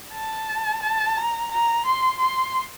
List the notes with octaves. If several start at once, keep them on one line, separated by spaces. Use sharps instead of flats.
A5
A5
A#5
A#5
C6
C6